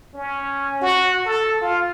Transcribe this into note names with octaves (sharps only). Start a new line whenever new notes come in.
C#4
F#4
A4
F4